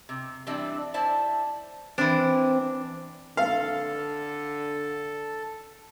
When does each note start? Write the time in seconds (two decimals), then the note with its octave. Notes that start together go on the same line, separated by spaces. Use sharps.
0.09 C3
0.47 E3 G3 C4 D4 D5 E5
0.94 E4 C5 D5 E5 A5
1.98 E3 C4 D4
3.37 D3 A4 F5